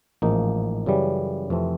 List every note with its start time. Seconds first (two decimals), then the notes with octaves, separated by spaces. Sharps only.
0.22 A1 G#2 F3 A#3 D#4
0.86 F#2 C#3 E3 G3
1.50 F2 C3 E3 A3 C4